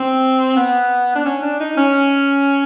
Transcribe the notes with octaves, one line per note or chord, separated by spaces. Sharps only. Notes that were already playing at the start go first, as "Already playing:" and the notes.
Already playing: C4
B3
D4
C#4
D4
D#4
C#4